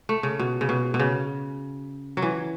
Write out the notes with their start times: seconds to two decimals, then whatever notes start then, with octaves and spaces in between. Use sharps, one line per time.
0.09 A3
0.23 C#3
0.39 B2
0.61 C#3
0.69 B2
0.94 B2
1.00 C#3
2.17 F#3
2.22 E3